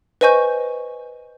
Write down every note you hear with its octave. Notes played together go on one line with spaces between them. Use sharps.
B4 C5 D#5 G#5 C#6 G6